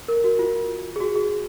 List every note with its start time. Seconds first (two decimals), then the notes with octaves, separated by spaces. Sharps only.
0.08 A#4
0.24 F#4
0.39 F4
0.96 G#4
1.01 F#4
1.16 G#4